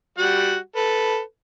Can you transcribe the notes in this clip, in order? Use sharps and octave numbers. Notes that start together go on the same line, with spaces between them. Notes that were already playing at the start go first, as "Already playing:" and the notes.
G3 F#4 F#5
A4 B4